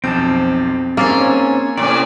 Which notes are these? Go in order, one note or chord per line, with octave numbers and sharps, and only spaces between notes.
B1 F2 C4 A5 G6
G#2 A#3 C#4 E6 A6 C7
A2 C3 C#4 D5